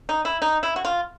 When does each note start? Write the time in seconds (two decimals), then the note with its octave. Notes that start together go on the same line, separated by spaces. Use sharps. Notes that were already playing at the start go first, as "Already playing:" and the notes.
0.09 D#4
0.25 E4
0.42 D#4
0.63 E4
0.76 F#4
0.85 F4